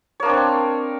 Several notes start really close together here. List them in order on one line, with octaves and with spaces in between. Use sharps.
C#5 A#3 D4 C4